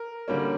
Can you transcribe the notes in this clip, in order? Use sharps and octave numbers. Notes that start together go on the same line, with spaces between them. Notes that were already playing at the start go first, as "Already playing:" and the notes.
Already playing: A#4
D3 G3 A#3 C#4